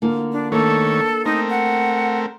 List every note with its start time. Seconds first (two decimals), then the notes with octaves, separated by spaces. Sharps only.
0.02 D3 A#3 F4
0.32 D4
0.52 D#3 A3 A#3 D4 A4 C#5
1.25 A3 C4 D#4 A#4
1.50 F#5